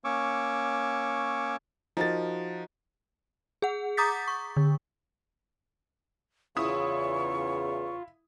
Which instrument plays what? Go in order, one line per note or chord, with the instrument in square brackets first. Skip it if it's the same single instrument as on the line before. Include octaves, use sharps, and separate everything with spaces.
[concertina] A#3 C#4 C#5 C#6 D6 E6
[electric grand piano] F3 A6 [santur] D#4 F#4 A#4
[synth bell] G#4 F#5
A#5 D6 D#6 G6 A6 B6
C#6
D3
[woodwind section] E2 C#3 [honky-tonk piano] E4 D#6 [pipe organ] F4 [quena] C#6